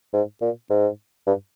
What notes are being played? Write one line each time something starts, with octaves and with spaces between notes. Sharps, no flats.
G#2
A#2
G#2
G2